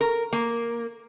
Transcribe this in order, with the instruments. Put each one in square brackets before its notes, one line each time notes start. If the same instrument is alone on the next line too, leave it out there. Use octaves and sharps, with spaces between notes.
[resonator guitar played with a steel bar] A#4
A#3